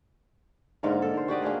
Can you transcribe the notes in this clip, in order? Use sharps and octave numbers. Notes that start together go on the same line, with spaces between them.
G#2 D3 A#3 A#4
A4
A#4 C5
F#4 G4 D5 D#5
A#3 D4 G#4 A#4